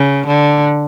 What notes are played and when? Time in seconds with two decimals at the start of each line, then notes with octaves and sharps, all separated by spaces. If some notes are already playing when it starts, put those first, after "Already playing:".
Already playing: C#3
0.27 D3